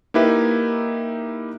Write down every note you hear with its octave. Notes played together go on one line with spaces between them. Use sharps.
A#3 D#4 E4 G4 B4 E5